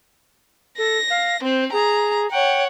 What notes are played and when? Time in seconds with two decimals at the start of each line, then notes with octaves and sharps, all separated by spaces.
0.78 A4 A#6
1.10 F5
1.43 C4 C5
1.73 G#4 A#5
2.31 C#5 F#5 G5